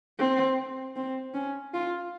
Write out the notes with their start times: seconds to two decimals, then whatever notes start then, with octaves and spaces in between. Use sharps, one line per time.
0.19 C4
0.96 C4
1.34 C#4
1.74 F4